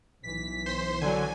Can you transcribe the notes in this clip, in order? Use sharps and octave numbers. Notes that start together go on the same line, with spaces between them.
B1 E3 B6
C5 C6
D3 F#3 G#5